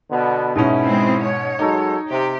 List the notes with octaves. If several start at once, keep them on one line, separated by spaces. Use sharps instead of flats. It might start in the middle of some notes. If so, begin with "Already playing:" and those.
B2 D3 B3
G#2 B2 C#4 E4
G#3 C4
C#5
F#3 G#3 D#4 A4
C3 G4